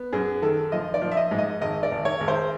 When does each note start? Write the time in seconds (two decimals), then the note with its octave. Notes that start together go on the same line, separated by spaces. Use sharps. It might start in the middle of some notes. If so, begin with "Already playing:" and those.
Already playing: B3
0.12 F#2 G#4
0.42 D#3 A4
0.72 F3 D#5
0.94 D5
1.02 F3
1.12 E5
1.17 D#5
1.31 G#2
1.38 D#5
1.61 G#1 D#5
1.83 D5
1.91 G#1
2.05 C#5
2.20 G#1
2.28 C5